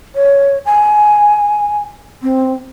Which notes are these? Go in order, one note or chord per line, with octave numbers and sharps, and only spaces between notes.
C#5
G#5
C4